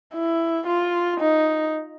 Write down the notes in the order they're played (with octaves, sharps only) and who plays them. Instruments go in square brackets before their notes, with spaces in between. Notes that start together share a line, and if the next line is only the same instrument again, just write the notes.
[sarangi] E4
F4
D#4